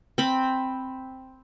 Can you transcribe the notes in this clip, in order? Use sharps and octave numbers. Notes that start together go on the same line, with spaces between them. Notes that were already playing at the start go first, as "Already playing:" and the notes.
C4 B5